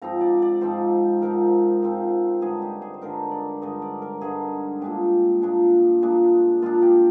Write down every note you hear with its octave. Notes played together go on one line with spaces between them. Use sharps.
G#2 F3 C4 D#4 A#5
D5
D5
G#2 F3 C4 D#4 C5
G#2 F3 C4 D#4 A#4
G#2 F3 C4 D#4
G2 D3 G#3 D#4 G#4
G4
G#4
C5
G2 D3 G#3 D#4 A#4
D5
G2 D3 G#3 D#4 D#5
D5
A#4
G2 D3 G#3 D#4 G#4
A#2 G#3 D4 G4
A#2 G#3 D4
A#2 G#3 D4
A#2 G#3 D4 F4
G4